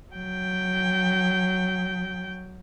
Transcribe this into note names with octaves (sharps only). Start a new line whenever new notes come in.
F#3 G5